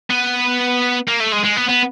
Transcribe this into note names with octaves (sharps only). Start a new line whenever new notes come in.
B3
A#3
A3
G#3
G#3
B3
B3